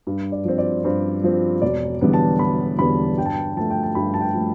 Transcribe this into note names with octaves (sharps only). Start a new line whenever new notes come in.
G2
D5
F3 C4
D5
G2 C5
F3 C4
E1 D5
E2 D3 G3 B3
A5
E1 B5
E2 D3 G3 B3 B5
G2 G5
A5
G5
F3 A3 A5
G5
A5
G2 B5
A5
G5
F3 A3